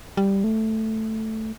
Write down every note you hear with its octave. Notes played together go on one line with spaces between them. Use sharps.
G3
A3